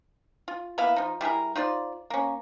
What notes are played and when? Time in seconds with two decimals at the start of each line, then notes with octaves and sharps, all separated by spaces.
0.48 F4
0.78 A#3 B3 E4 F5
0.96 F3 D#4
1.21 G3 E4 G#4 A#4
1.56 D#4 F4 C5 D5
2.10 A#3 C#4